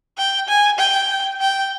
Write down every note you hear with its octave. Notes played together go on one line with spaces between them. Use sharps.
G5
G#5
G5
G5